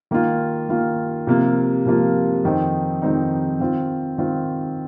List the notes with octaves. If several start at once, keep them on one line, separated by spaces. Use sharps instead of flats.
D#3 A#3 F4
D#3 A#3 F4
C3 F3 A#3 F4
C3 F3 A#3 F4
F2 D#3 C4 D#4
F2 D#3 C4 D#4
D#3 C4 F4
D#3 C4 F4